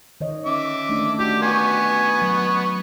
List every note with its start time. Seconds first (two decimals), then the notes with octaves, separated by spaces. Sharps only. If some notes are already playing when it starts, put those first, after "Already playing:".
0.21 D#3 C#5 D#5
0.46 C#4 E5 D6
0.89 A3 D4
1.19 F#4 G4
1.43 B3 G#5 C#6
2.22 F#3